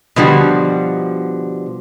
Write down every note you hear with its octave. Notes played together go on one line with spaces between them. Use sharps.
B2 D3 F3 G3 F#4